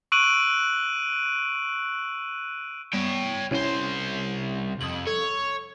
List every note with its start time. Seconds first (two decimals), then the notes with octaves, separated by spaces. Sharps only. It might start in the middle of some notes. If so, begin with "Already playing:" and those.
0.12 C#6 E6 F#6 D7 D#7 F#7
2.93 G3 B3 C#5 G5
3.51 C2 C#4 E4 C5 C#5
4.81 F2 D#6 F#7
5.07 A4 C#5